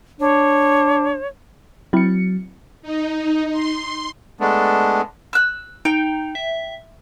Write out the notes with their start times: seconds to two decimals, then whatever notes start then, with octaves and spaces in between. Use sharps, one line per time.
0.20 D4 C#5
1.93 F#3 C4 E4 C#7
2.82 D#4
3.51 C6
4.41 G#3 A3 B3 D4
5.33 E6 F#6
5.85 D#4 G5
6.35 E5